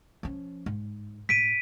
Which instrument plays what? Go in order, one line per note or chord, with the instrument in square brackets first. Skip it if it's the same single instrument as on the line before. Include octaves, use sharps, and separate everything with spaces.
[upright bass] F3 C#4
G#2
[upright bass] A2 [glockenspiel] B6 D7 D#7